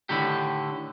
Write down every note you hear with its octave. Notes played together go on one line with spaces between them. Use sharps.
A2 D3 D#3 F#3 G4